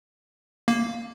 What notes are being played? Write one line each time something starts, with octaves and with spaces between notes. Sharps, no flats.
A#3